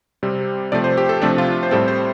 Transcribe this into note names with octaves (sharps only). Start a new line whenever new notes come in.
C3 G3 C4
C3 F3 A3 D5
C5
G4
A4
C3 F3 A3 C4 D4
F4
C5
A2 G3 C4 A4
C5